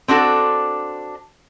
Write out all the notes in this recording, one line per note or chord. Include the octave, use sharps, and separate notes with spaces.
C4 D4 F#4 A4